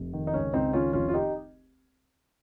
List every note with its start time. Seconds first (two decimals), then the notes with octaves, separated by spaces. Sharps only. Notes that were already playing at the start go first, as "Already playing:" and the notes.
Already playing: F1
0.13 D#3
0.27 D#4
0.33 C#2 C#4
0.53 C#2 C4 D#4
0.73 D#3 C#4 F4
0.93 F1 C#4 F4
1.08 F4
1.14 D#4 G4